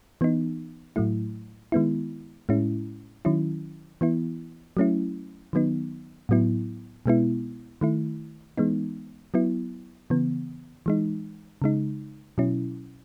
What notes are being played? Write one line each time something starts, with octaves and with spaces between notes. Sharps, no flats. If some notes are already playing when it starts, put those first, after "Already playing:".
E3 B3 D#4
A2 F#3 A3 E4
D#3 G#3 B3 E4
A2 G#3 C#4 E4
D#3 F#3 C#4 E4
E3 B3 E4
F#3 A3 C#4 E4
D#3 F#3 B3 D#4
A2 F#3 B3 E4
B2 G#3 B3 E4
D#3 A3 E4
E3 G#3 B3 D#4
F#3 B3 E4
C#3 E3 B3
E3 G#3 D#4
C#3 G#3 D#4
B2 F#3 C#4 E4